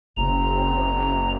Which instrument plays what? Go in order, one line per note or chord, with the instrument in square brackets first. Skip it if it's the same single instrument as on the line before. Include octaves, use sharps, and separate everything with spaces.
[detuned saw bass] F#1 [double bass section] C#3 C4 [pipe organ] A#5